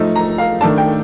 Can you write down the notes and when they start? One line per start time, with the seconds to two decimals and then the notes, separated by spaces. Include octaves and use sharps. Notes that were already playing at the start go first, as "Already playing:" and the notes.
Already playing: F3 A3 D#4
0.16 A#5
0.38 F5
0.61 D#3 A3 D4 A5
0.78 G5